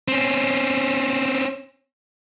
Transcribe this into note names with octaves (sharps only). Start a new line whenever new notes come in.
C4 C#4